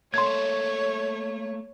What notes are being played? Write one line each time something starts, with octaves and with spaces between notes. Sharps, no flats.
A3 A#3 A4 C#5 C6 G#6